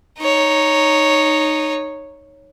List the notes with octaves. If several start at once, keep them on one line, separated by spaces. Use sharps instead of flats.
D#4 C#5